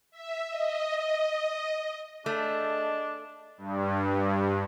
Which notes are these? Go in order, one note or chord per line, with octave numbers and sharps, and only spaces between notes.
E5
D#5
A3 D4 G#4 A4 D#5
G2